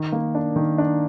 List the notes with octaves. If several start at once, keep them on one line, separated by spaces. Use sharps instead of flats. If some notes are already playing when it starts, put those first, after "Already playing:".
Already playing: D#3
A#3
D4
D#3
D4